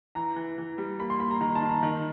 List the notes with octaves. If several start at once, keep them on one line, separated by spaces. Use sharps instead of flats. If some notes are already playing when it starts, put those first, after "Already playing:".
E3 A#5
E3
E3
G3
A#3 B5
C6
A#3 B5
A#5
D#3 A#5
A5
D#3
A#5
D#3